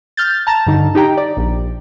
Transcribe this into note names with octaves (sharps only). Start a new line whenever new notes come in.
F6 G6 A6
A5 A#5 A6
G2 D3 D#4
D#4 G4 G5 A#5
D5
A#1